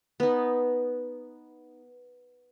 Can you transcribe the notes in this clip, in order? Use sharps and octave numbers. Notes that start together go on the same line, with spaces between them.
B3 D#4